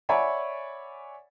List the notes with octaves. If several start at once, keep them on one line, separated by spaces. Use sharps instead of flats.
C#5 D5 E5 F#5 G#5 B5